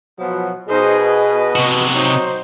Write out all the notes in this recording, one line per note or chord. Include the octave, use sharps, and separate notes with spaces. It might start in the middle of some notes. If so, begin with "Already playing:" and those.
B2 F3 F#3 B3
B2 D#4 G#4 C5 D#5
B4
C3 F#4
F#3 D#4 C5